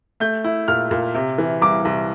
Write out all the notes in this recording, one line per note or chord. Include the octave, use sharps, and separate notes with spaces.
A3 G6
E4
A#2 F6
A#2
C3
E3
C2 D6
C2